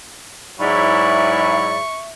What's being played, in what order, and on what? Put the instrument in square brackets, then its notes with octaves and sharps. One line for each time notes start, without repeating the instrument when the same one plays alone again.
[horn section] G#2 F#3 E4 [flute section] D5 B5 [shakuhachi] E5 [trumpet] C#6